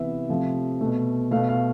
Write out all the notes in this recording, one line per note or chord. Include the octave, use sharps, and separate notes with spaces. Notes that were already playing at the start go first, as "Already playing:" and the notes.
Already playing: C3 E3 B3 E5
C3 F3 A3
B2 A3
B2 A3 F5
F5